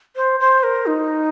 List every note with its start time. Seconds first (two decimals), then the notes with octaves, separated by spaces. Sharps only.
0.16 C5
0.40 C5
0.63 A#4
0.86 D#4